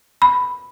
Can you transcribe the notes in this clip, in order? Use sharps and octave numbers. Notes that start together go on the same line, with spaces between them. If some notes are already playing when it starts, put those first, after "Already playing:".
B5